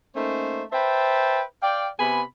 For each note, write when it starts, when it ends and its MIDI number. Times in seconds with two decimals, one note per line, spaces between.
0.16 0.63 57
0.16 0.63 58
0.16 0.63 61
0.16 0.63 63
0.16 0.63 72
0.73 1.42 71
0.73 1.42 72
0.73 1.42 76
0.73 1.42 79
0.73 1.42 81
1.62 1.89 74
1.62 1.89 77
1.62 1.89 79
2.00 2.22 48
2.00 2.22 59
2.00 2.22 80
2.00 2.22 83